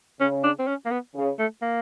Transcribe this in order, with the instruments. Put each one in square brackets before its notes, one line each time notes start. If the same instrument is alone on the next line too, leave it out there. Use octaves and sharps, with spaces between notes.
[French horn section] C#3 [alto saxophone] C#4
[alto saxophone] D4
C4
C#4
A#3
B3
[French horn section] C#3
[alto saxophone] A3
A#3